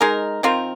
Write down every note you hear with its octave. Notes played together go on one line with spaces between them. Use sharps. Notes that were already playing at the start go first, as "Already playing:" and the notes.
G#3 D#4 A#4
D#3 C4 F4 A#4